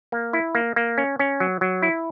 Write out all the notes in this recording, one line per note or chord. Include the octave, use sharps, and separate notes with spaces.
A#3
E4
A#3
A#3
C#4
C#4
F#3
F#3
E4